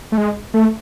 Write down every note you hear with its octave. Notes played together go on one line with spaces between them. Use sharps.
A3
G#3
A3